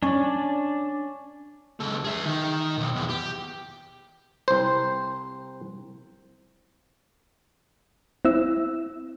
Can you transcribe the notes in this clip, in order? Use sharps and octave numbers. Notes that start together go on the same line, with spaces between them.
C#4 D4 D5
C#2 A4
G#4 E5
D#3
B1
E2
G4
C2 C5
C4 E4 E6